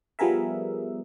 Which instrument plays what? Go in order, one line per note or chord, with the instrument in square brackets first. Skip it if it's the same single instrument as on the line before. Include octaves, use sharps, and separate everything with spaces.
[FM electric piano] F3 G3 B3 G#4 A#4 E5